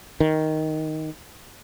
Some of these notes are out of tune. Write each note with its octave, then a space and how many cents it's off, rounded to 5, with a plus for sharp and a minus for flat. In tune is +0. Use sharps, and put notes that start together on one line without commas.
D#3 +5